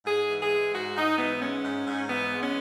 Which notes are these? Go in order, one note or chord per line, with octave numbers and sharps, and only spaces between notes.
G#2 G#4
E3
G#4
G#3
G#2 F#4
G#2 D#4
E3 B3
G#3 C#4
G#2
G#2
E3 B3
G#3
C#4